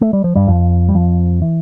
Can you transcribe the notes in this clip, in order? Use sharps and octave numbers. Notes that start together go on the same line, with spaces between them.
A3
G3
F3
G2 G3
F2 F3
G3
F2 F3
E3